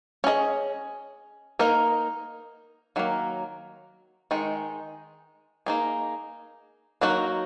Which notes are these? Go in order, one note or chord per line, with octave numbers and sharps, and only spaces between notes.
C#4 G#4 D#5
A#3 D#4 A#4 D#5
D#3 F#3 A#3
D#3 G#3 D#4
A#3 D#4 G#4
F#3 A#3 D#4 F#4